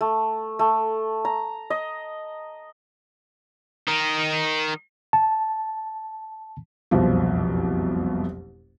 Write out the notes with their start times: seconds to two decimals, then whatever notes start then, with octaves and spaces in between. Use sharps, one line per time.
0.01 A3
0.59 A3
1.25 A#5
1.70 D#5
3.88 D#3 D#4
5.13 A5
6.91 F#1 C2 F2 B2 F3